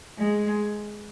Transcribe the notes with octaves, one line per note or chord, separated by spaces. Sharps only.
G#3